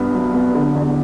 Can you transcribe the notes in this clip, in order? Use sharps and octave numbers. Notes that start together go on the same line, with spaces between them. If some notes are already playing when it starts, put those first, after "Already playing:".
Already playing: C2 G2 B3
F#3
B3
D3
E2